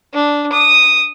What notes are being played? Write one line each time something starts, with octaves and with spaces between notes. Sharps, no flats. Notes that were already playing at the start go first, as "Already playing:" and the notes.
D4
D#6